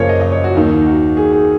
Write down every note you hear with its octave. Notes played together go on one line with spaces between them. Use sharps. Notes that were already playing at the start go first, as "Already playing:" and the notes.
Already playing: F#2 C#3 F3 A#3 A#4 C5 C#5
D#5
D#5
C#5
F#4
D#2 D#3 A#3 D#4
D#4
F#4
G#4
G#4